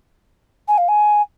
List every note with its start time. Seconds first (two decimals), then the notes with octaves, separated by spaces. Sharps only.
0.68 G#5
0.78 F5
0.88 G#5